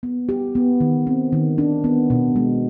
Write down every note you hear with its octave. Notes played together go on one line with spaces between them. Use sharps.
B3
G4
B3
D#3
C4
D#3
D4
B3
B2
G#3